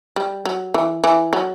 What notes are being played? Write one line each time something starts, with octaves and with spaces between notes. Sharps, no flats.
G3
F#3
E3
E3
F#3